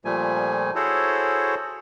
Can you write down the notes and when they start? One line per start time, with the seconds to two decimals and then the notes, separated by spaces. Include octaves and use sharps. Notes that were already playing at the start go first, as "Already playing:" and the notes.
0.05 A#2 F3 G3 A3 G#5
0.75 E4 F#4 G#4 A4 C5 C#5